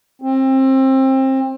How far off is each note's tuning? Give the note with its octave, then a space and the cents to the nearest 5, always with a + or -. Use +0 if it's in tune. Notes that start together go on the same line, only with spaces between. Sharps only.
C4 +25